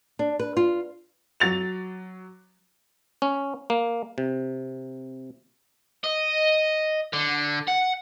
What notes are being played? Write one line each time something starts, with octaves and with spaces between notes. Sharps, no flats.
D4
B4
F4
F#3 A6 F7
C#4
A#3
C3
D#5
D3
F#5